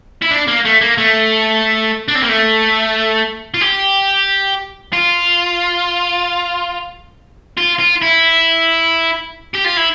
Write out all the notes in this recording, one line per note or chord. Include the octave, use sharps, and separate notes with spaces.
E4
D4
A#3
A3
A#3
A3
D4
C4
A#3
A3
F4
G4
F4
F4
F4
E4
G4
F4
E4